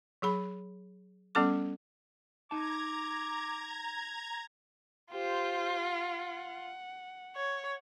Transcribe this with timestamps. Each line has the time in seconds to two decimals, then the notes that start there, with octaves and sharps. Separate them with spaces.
0.22 F#3 G#4 B5
1.35 G3 B3 C#4 A4 D6
2.51 D#4 A5 A#5 D6 G#6
5.12 F4 G4 C5
5.83 F#5
7.36 C#5